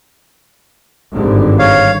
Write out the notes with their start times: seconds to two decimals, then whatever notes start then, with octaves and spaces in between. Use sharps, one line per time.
1.13 G#1 G2 D3
1.59 C#5 F5